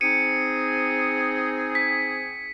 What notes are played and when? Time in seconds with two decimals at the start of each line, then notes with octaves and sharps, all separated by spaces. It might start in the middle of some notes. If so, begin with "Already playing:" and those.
0.01 C4 D#4 G#4 C#7 D#7
1.75 B6